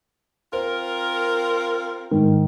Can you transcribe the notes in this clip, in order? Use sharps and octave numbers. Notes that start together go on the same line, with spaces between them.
C4 F4 A#4 C5
G#2 D#3